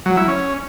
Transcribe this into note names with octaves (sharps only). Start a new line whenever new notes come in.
F#3
E4
C#4